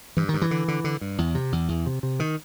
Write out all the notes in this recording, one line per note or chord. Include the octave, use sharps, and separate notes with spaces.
G2 E3
G2 D#3
E3
D3
D3
D3
G2
E2
C3
E2
E2
C3
C3
D#3